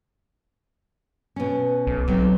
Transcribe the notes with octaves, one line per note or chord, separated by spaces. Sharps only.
B2 C#4
B1
B1 F#3 B3 C4